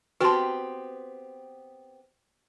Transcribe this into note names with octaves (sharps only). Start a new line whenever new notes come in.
B3 C4 F#4 G4 B4 A5 C6